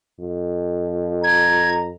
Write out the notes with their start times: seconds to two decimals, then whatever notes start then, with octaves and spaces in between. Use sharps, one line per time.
0.19 F2
1.23 A#5 G#6